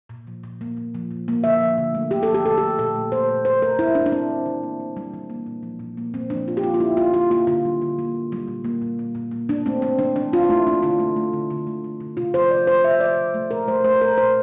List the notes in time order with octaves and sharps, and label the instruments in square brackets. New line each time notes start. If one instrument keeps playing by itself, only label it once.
[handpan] A#2
F3
A#2
A#3
A#2
F3
A#2
A#3
D3 E5
F3
D3
A3
D3 G4
A4
F3
G4
D3 A4
G4
A3
A#2 A4
A3
A3 C5
A#2
A#2 C5
A3 A#4
A3 E4
A#2 D4
D4
E3 C4
G3
E3
A#3
E3
G3
E3
A#3
A#2
F3
A#2
A#3
A#2 C4
F3 D4
A#2 F4
G4
A#3 F4
F4
D3 E4
G3 F4
D3 F4
A#3 F4
D3 F4
G3
D3
A#3
A#2
G3
A#2
A#3
A#2
G3
A#2
A#3
E3 D4
A3 C4
A3 C4
E3 D4
E3 D4
A3 F4
F4
A3 E4
E3 D4
D3 F4
A3
A3
D3
D3
A3
A3
D3
C3 F4
F3 C5
C3 D5
A3 C5
C3 E5
F3 D5
C3
A3
A#2 A#4
A3 C5
A3 C5
A#2 A#4
A#2 C5